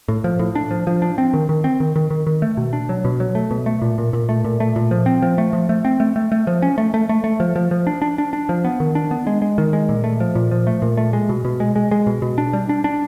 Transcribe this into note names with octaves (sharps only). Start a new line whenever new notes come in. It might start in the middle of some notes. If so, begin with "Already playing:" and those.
A2
F3
A2
D4
F3
F3
D4
C4
D#3
D#3
C4
D#3
D#3
D#3
D#3
A3
B2
D4
F#3
B2
F#3
A3
B2
A3
A#2
A#2
A#2
A3
A#2
A3
A#2
F3
C4
F3
A3
F3
A3
C4
A3
A3
A3
F3
C#4
A3
A3
A3
A3
F3
F3
F3
D4
D4
D4
D4
F3
B3
D#3
D4
B3
G#3
G#3
D#3
G#3
A#2
A3
F3
A#2
F3
A3
A#2
A3
G#3
B2
B2
G#3
G#3
G#3
B2
B2
D4
G3
D4
D4